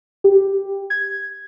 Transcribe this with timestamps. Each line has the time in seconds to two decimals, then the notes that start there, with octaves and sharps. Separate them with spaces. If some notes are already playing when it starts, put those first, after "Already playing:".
0.24 G4
0.90 G#6